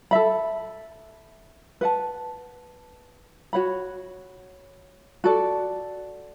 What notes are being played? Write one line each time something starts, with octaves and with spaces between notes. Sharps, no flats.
A4 E5 B5
B4 F#5 A5
F#4 C#5 F#5 B5
F#4 A4 D5